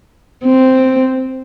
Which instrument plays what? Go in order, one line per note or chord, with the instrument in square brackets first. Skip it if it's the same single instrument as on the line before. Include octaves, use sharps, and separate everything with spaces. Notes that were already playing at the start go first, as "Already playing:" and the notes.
[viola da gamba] C4